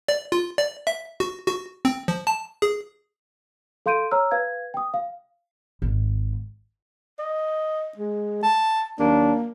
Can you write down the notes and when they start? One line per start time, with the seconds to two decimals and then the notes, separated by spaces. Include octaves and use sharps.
0.08 D5
0.32 F4
0.58 D5
0.87 E5
1.20 F#4
1.47 F#4
1.85 C4
2.08 F3
2.27 A5
2.62 G#4
3.86 A4 F5 C6 G6 D7 D#7
4.11 C#5 A#5 E6 F6
4.31 B4 F5 G#6
4.74 G5 D#6
4.94 F5
5.82 G#1
7.19 D#5
7.97 G#3
8.43 A5
8.99 D#2 F#3 A#3 D4